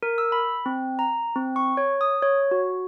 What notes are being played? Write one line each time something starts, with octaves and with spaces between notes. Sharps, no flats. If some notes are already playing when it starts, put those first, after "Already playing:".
A#4
E6
B5
C4
A#5
C4
C#6
C#5
D#6
C#5
F#4